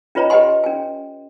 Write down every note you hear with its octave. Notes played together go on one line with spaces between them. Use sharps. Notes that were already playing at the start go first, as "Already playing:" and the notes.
C#4 F4 B4 C#5 D#5 A#5
G4 B4 D#5 F#5 G#5 C6
C#4 G#5